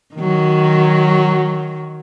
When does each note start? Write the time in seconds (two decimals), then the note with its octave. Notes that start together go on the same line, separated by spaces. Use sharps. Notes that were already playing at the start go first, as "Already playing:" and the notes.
0.15 D#3 F#3